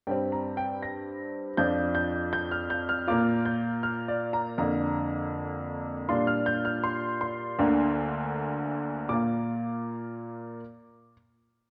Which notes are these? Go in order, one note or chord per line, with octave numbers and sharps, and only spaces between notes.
G2 G3 C4 G5
A#5
G5
A#6
F2 F3 D4 F4 G6
G6
G6
F6
G6
F6
A#2 A#3 F4 D6
G6
F6
D5
A#5
F2 D3 A#3 A#5
A#2 G3 D4 F4 C6
F6
G6
F6
C6
C6
D2 D3 A#3
A#2 A#3 F4 D6